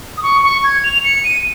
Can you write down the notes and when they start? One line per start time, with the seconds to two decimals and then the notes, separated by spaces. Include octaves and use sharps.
0.17 D#6
0.23 C#6
0.43 C#6
0.64 G#6
0.84 F7
1.04 C#7
1.24 D#7